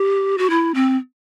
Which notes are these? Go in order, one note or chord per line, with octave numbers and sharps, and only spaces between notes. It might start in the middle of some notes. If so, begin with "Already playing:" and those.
Already playing: G4
F#4
E4
C4